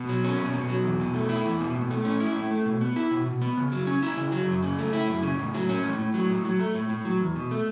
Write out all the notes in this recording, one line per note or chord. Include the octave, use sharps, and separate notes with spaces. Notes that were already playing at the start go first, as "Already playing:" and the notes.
Already playing: B2
F#3
C#4
B2
B2
F#3
E2
B2
A3
E4
E2
B2
A2
A3
C#4
E4
A2
A3
B2
B3
E4
B2
B2
B3
C#3
F#3
C#4
E4
C#3
F#3
F#2
C#3
A3
E4
F#2
C#3
A2
F#3
C#4
A2
A2
F#3
A2
F#3
A3
A2
A2
F#3
E2
B2
A3